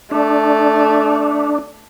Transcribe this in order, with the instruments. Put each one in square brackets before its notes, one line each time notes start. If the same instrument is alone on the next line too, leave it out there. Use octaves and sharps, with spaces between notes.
[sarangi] A3 [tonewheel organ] D4